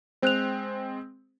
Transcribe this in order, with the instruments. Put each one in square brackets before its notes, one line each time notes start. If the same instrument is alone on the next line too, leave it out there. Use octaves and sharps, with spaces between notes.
[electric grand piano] G#3 C4 [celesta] C5 F#6 F7